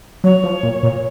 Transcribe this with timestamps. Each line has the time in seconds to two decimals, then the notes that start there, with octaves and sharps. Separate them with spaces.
0.24 F#3 C#5
0.44 F3
0.63 A#2
0.83 A#2